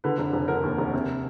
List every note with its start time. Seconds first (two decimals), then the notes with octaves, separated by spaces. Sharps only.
0.04 D3 B4
0.18 F1
0.33 F1
0.48 D3 A#4
0.63 D#2
0.78 F1
0.94 C3